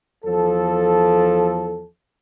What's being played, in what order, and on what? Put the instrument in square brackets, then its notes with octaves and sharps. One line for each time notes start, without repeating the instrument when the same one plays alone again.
[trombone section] E2 F3 A4